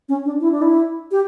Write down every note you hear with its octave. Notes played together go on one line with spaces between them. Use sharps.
C#4
D4
E4
D4
E4
G4